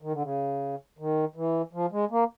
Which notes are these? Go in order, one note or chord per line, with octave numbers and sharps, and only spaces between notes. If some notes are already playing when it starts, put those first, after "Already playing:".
D#3
D3
C#3
D#3
E3
F3
G#3
A#3